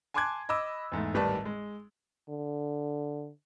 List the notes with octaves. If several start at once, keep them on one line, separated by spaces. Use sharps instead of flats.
G#5 A5 C6 D6 F#6 G#6
D#5 B5 D6 E6
E2 G#2 A3
G#1 A2 G3 B4 D5 A5
G#3
D3